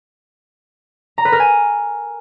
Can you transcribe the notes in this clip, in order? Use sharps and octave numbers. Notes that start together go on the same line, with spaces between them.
A#5
B4
A#4
G#5